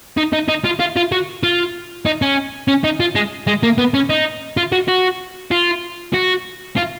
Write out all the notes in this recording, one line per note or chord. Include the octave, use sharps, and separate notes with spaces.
D#4
D#4
D#4
F4
F4
F4
F#4
F4
D#4
C#4
C#4
D#4
F4
G#3
G#3
A#3
B3
C#4
D#4
F4
F#4
F#4
F4
F#4
F4